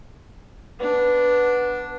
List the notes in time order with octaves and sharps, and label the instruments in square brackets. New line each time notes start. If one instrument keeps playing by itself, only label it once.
[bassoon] B3 [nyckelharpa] D4